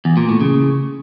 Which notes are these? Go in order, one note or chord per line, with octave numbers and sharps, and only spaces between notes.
E2
A#2
A2
C#3